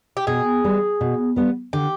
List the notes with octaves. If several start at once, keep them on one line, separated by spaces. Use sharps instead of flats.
G4
B2 G#4
G3 B3
B2
G3 B3
D3 G4